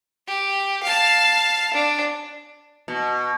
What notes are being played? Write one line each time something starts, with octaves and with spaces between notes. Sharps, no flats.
G4
F5 A5
D4
B2